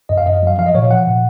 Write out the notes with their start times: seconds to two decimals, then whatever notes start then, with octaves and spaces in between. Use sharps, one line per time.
0.09 F#2 D#5
0.18 F5
0.26 F#2 D#5
0.37 D#5
0.43 F#3 F5
0.58 F3 F5
0.66 D#5
0.75 A#2 C#5
0.82 F5
0.90 F3 F#5
1.07 A#2